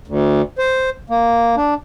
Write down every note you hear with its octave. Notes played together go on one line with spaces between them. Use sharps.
D2
C5
A#3
D4